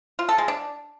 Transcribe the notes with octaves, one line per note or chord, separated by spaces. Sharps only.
F4
A4
G#3
D4